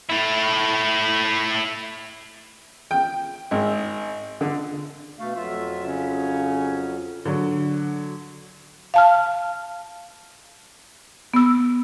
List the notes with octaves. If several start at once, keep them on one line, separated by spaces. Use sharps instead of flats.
A3 E4
G5
G#1
D3
B2 A3 F5
F2 F#3 F4 E5
C#3 C#4
D3 F#3
F5 A5 F6
B3 E6